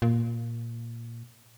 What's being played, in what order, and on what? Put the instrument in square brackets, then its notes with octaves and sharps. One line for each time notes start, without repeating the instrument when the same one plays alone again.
[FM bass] A#2